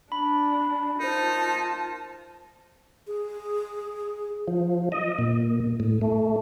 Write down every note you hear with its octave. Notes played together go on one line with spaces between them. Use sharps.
D4 B5
D#4 F4 A#4 C5 A5
G#4
F3
D#5
A#2
A2
A3